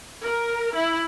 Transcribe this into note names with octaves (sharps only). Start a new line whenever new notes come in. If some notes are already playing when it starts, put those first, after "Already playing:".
A#4
E4